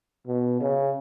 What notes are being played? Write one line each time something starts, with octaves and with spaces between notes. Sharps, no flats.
B2
C#3